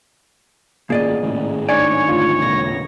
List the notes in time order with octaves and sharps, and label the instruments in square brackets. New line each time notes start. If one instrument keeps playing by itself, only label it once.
[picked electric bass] G#1 A#2 C#3 [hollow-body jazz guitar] A#3 D5 D#5 [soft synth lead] G#4
[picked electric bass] G#1 A2 C#3
[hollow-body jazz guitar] D4 D#4 D5 [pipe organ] C#5 [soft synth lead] G#5
[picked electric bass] G#1 D2 [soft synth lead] F4
[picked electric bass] E1 A#2 D3 [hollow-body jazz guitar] C#2 [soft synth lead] A#6